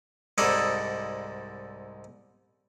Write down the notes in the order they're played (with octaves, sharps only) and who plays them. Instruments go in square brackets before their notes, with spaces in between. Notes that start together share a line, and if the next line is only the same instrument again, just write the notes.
[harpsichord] C2 G#2 D#4 E4 A4 D5